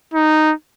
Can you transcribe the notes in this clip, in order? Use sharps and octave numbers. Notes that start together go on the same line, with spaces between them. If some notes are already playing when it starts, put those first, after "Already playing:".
D#4